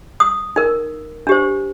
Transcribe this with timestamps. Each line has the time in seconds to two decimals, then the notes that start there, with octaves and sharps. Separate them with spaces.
0.20 D#6
0.56 D#4 A#4
1.27 D4 G4 C5